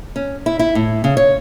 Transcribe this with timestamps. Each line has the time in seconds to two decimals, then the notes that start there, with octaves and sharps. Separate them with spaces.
0.16 C#4
0.46 E4
0.59 E4
0.75 A2
1.04 C#3
1.17 C#5